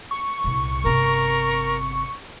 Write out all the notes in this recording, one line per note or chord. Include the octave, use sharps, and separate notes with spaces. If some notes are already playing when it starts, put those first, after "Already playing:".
C#6
C2 A#2
G1 C3 A#4